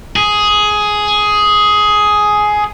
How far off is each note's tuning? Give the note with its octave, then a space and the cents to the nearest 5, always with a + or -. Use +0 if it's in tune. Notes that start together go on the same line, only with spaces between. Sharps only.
G#4 +10